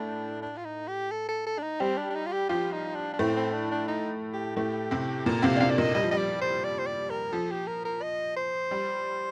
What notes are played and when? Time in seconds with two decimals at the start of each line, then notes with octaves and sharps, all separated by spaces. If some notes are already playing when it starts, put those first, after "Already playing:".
Already playing: A2 A3 D4
0.42 D4
0.57 F4
0.65 D#4
0.88 G4
1.11 A4
1.29 A4
1.47 A4
1.59 D4
1.63 D#4
1.80 G3 C4 G4
1.97 D4
2.10 D4
2.15 D#4
2.26 F4
2.33 G4
2.49 F3 F4 G4
2.73 D#4
2.95 D4
3.13 D4
3.19 A2 A3 C4
3.36 C4
3.54 D4
3.71 D4
3.88 D#4
4.33 G4
4.56 A2 A3 G4
4.91 C3 C4
5.26 A#2 A#3 A#4
5.43 C3 C4 F5
5.56 D4
5.60 C3 C4 F5
5.71 D5
5.78 A#2 A#3 D#5
5.94 G3 D#5
6.03 F3
6.11 G3 D#5
6.17 D5
6.42 C5
6.64 D5
6.79 C5
6.86 D5
7.10 A#4
7.33 F3 A4
7.51 G4
7.67 A#4
7.85 A#4
8.02 D#5
8.37 C5
8.71 G3